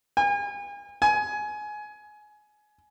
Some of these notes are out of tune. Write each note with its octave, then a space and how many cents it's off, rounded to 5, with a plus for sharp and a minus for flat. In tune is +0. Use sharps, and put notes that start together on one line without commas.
G#5 -40
G#5 +20